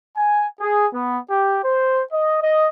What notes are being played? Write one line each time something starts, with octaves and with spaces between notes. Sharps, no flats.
G#5
G#4
B3
G4
C5
D#5
D#5